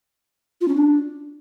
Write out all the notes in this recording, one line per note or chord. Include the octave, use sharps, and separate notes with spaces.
F4
C#4
D4